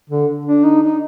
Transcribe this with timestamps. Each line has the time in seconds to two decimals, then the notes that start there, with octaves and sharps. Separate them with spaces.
0.10 D3
0.46 D4
0.64 D#4
0.82 D#4